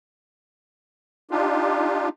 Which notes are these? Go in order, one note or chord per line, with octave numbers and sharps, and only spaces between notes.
D4 D#4 F4 G4